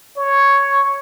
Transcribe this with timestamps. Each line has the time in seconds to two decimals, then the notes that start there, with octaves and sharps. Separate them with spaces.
0.17 C#5